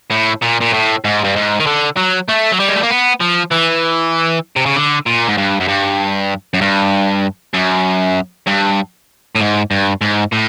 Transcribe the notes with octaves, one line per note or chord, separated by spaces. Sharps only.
A2
A#2
A#2
A2
G#2
G2
G#2
D#3
D3
F#3
A3
F#3
G3
G#3
A3
A#3
B3
F3
E3
C3
C#3
D3
A#2
G#2
G2
F#2
G2
F#2
G2
F#2
G2
A2
G#2
G2
G#2
A2